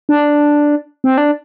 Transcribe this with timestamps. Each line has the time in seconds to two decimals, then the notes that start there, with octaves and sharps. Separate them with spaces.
0.09 D4
1.04 C4
1.18 D4